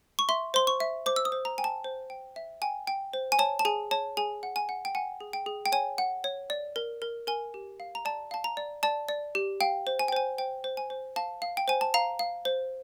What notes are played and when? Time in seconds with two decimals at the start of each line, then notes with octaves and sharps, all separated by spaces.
0.19 C#6
0.29 E5 C6
0.54 C5 C6
0.67 C#6
0.80 E5
1.06 C5 D6
1.16 E6
1.25 D#6
1.32 C5
1.45 A#5
1.58 G5 G#5
1.64 A5
1.84 C5
2.10 G5
2.36 E5
2.62 G5 G#5
2.87 G5
3.13 C5
3.32 G#5
3.39 C#5 A5
3.59 A5
3.65 G#4 G#5
3.91 C#5 A5
4.17 G#4 G#5
4.43 F#5
4.56 G#5
4.69 F#5
4.85 G5
4.95 F#5 G#5
5.20 G#4
5.33 G5
5.46 G#4
5.66 G5
5.72 C#5 G#5
5.98 F#5
6.24 C#5
6.50 D5
6.76 A#4
7.02 A#4
7.27 A#4 G#5
7.54 G4
7.80 F5
7.95 A#5
8.05 D5 A5
8.31 F5 A5
8.44 A#5
8.57 D5
8.83 D5 A5
9.08 D5
9.35 G4
9.61 F5 G5
9.87 C5
9.99 G#5
10.08 G5
10.13 C5 G#5
10.38 C5 G5
10.64 C5
10.77 G#5
10.90 C5
11.16 F5 A5
11.42 F5
11.57 G5
11.68 C5 G#5
11.81 A5
11.94 F5 A#5
12.19 F5
12.45 C5